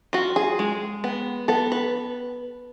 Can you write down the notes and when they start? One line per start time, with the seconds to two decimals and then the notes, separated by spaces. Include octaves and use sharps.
0.13 F4 F#4
0.36 G#4
0.59 G#3
1.04 B3
1.48 B3 A4
1.72 B4